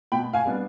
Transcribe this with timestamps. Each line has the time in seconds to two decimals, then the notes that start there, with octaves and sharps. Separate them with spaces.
0.12 B2 G5 B5
0.33 F5 G#5
0.45 G3 B3 D4